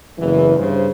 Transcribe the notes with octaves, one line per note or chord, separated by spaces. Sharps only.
F#1 E2 E3
G2 C#3 C5